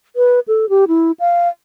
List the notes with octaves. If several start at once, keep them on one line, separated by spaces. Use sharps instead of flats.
B4
A4
G4
E4
F5